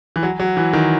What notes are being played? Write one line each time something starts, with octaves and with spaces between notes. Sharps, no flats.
E3
F#3
F#3
E3
D#3